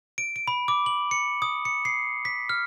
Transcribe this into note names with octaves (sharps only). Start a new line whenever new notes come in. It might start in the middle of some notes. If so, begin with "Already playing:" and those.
D7
D7
B5
D6
F#7
C#7
D#6
C#7
C7
B6
F6